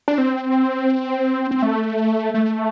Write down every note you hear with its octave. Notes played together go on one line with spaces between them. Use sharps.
D4
C4
C4
A3
A3